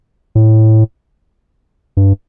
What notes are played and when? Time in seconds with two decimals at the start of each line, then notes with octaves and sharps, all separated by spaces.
0.35 A2
1.97 G2